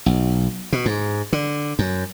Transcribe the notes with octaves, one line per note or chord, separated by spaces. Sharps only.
B1
B2
G#2
D3
F#2